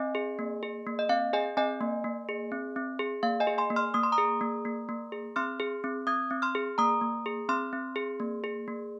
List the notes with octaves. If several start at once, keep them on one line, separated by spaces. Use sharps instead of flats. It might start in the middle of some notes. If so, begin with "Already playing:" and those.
Already playing: C4 D#5 G#5
G#4
A#3
G#4
A#3
D#5
C4 F5
G#4 D#5 G#5
C4 D#5 G#5
A#3
A#3
G#4
C4
C4
G#4
A#3 F5
D#5 G#5
G#4
G#5 C6
A#3
C6 F6
A#3 D#6
C6
A#5 D#6
G#4
A#3
A#3
A#3
G#4
C4 C6 F6
G#4
C4
C4 D#6 G#6
C4
C6 F6
G#4
A#3 A#5 D#6
A#3
G#4
C4 C6 F6
C4
G#4
A#3
G#4
A#3